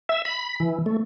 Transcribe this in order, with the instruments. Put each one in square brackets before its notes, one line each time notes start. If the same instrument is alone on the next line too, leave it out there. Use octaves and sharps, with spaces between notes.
[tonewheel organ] E5
B5
E3
A3